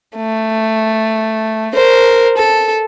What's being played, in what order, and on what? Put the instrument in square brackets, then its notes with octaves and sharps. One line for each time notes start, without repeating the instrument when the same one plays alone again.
[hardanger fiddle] A3
A#4 C5
A4